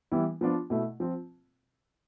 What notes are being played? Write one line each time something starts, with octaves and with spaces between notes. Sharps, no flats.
E3 G3 B3 E4
F3 B3 D4 F4
B2 A3 E4
F3 C4 F4